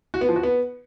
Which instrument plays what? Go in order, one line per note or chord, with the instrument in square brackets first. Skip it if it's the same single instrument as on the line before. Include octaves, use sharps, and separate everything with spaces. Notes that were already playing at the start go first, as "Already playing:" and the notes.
[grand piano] F#4
B3
F3
F#4
B3